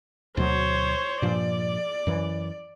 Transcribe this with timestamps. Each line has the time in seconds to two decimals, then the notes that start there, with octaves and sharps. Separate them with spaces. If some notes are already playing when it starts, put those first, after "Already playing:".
0.37 D2 B2 F#3 C5 C#5
1.22 G2 A#2 F3 D5
2.07 F#2 E3